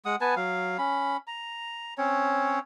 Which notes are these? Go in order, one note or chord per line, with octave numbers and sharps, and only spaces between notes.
G#3 F#5 D#6
B3 B4 G#5 A5
F#3 F5
C#4 B5
A#5
C4 C#4 C#5